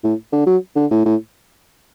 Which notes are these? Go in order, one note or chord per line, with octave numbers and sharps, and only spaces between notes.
A2
D3
F#3
D3
A2
A2